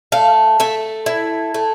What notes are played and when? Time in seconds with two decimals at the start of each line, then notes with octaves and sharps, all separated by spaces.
0.12 A3 F5
0.60 A3 E5
1.06 E4
1.54 A3